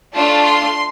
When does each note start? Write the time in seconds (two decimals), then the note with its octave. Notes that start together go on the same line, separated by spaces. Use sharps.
0.14 A3 D4 F4 A5
0.45 C6